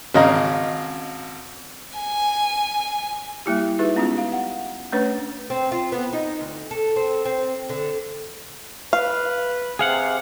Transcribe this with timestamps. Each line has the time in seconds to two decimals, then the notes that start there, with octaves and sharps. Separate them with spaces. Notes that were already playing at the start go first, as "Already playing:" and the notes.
0.14 G#1 C#3 D#5 F5 A#5
1.98 G#5
3.46 G3 A#3 E4 G4
3.79 D#4 E4 F#4 G#4 B4 E5
3.96 G#3 B3 C#4 F4 G4
4.18 F5
4.32 F#5
4.92 A3 C#4 D4 B4 C#5
5.50 C4
5.72 F4
5.92 B3
6.13 D#4
6.41 D2
6.71 A4
6.96 C4
7.25 C4
7.69 D3
8.93 B4 F5
9.79 C3 G#4 F5 F#5